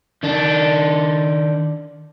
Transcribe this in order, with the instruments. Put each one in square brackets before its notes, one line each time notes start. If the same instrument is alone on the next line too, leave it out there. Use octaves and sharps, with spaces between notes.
[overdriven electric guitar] D#3 D4